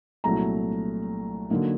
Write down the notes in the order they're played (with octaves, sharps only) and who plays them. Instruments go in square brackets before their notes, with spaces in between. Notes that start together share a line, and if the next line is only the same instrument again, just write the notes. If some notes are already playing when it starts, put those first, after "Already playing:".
[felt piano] C2 A#2 F#3 A3 A#5
D3 F#3 A#3 D#4